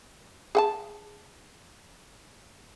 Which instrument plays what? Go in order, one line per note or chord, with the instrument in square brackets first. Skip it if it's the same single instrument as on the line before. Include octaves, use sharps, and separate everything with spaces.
[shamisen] G#4 F#5 A5